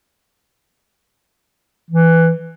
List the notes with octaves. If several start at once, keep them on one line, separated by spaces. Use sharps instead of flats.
E3